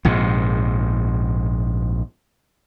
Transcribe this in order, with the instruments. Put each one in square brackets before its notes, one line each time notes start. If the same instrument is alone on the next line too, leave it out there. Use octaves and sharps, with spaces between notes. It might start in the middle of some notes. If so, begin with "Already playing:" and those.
[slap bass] A#1 G#2 C3